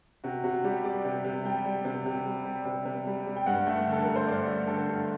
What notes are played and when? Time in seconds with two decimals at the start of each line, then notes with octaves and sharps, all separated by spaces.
0.24 C3 F#4
0.44 C3 F#4
0.64 G3 G4
0.84 G3 D5
1.05 C3
1.25 C3
1.45 G3 G5
1.66 G3
1.85 C3
2.06 C3
2.26 G3
2.46 G3
2.65 C3
2.86 C3
3.07 G3
3.27 G3
3.36 G5
3.46 G2 F#5
3.67 A3
3.87 D3
3.93 A4
4.04 G2 A#4
4.16 C5
4.27 G2 D5
4.47 A3
4.67 D3 A4
4.88 G2